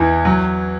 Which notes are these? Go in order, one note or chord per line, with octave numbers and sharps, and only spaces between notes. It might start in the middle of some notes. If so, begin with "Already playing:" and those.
Already playing: E2 E3
F#3